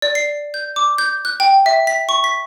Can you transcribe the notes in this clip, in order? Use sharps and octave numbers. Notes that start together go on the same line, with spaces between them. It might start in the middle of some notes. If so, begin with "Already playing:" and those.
D5
C7
G6
D6
G6
F#6
G5
E5
B6
C#6
B6